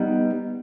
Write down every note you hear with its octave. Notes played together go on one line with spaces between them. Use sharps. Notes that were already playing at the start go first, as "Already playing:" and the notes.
Already playing: G3 B3 D#4